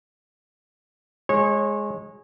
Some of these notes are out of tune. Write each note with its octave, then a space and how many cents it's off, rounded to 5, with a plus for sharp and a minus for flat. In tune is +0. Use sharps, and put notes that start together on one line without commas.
G#3 +0 C#5 -25